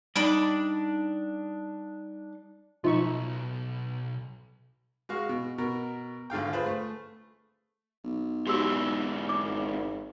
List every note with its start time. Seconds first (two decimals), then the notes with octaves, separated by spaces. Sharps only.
0.16 G3 D4 D#4 D5 B5 D6
2.84 B1 F3 D#4 E5 C#6
5.09 G#3 F#4 F5 C#6
5.29 B2
5.58 B2 A#4
6.30 G#1 D3 F5 G5
6.53 F4 G#4 B4 C5 B5
6.66 A3
8.04 B1
8.47 G#2 E3 F#4 G4 E6
9.29 D6
9.44 G#1